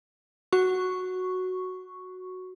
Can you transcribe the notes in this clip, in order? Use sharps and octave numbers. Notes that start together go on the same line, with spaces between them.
F#4 C#6